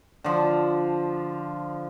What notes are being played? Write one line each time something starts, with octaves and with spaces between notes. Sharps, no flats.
D3 F3